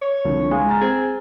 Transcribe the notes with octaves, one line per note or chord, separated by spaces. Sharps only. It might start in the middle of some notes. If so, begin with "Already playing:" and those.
C#5
C2 D3 F3
G#3 F5 G#5
A#5 F6 A6
C4 G#4